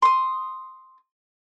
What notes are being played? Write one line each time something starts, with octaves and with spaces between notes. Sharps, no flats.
C6 D#6